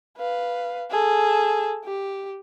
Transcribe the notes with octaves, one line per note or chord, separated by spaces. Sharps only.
B4 F5
G#4 A4
G4